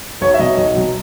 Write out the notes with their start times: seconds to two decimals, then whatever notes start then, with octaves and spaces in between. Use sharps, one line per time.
0.21 B1 C#5
0.34 E5
0.39 B2 F#3 D#5
0.57 B1
0.75 B2 F#3